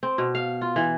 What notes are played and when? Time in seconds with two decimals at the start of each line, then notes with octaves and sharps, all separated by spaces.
0.03 C4
0.18 B2
0.35 F5
0.61 F4
0.76 E3